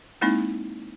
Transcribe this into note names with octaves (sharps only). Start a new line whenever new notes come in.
G#3 A#3 C4 D#4 E4